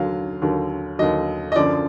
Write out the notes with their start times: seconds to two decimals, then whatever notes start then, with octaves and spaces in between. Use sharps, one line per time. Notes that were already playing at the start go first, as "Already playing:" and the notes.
Already playing: D#2 D3 F#3 F5
0.42 D#2 D3 F#3
0.99 D#2 D3 F#3 D#5
1.52 D#5
1.56 F#2 D3 F3 D5